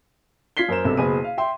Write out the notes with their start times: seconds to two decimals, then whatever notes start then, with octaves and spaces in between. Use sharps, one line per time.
0.57 F4 G#6 B6 C7 G7
0.69 F#2 A#4 C5 E7
0.85 B1 G2 C3 A4 E7
0.97 F#1 B2 G#4 B5 D#7
1.24 F5
1.38 E5 G5 C6